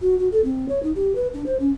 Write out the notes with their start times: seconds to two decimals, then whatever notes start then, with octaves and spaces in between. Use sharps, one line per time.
0.02 F#4
0.19 F#4
0.32 A4
0.44 C4
0.69 C#5
0.83 D#4
0.96 G4
1.15 B4
1.34 D4
1.46 C5
1.60 C#4